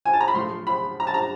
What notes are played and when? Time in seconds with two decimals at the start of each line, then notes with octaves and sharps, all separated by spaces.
0.05 G#5
0.13 A5
0.21 A#5
0.28 B5
0.34 A2 F3 A3 C6
0.67 B5
1.00 A#5
1.07 A5
1.14 A#5